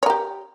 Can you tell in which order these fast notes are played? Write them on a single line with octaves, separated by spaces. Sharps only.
C#5 A#4 G4